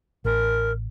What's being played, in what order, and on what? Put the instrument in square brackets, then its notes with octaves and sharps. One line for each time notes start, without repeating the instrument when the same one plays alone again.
[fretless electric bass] A1 [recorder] A#4